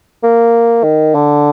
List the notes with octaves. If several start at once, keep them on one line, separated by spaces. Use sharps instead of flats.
A#3
D#3
D3